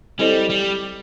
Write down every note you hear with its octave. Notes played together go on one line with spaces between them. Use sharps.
G3 C4 E4 A4 C5 D#5
G3